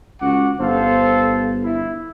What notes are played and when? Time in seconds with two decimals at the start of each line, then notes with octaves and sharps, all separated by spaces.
0.21 C#2 F#4 F#5 D6
0.60 G1 A4 C5 F5
1.63 E4